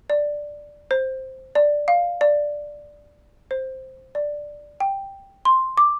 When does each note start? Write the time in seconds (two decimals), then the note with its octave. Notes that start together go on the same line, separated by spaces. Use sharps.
0.10 D5
0.91 C5
1.55 D5
1.88 F5
2.21 D5
3.51 C5
4.15 D5
4.80 G5
5.45 C6
5.77 D6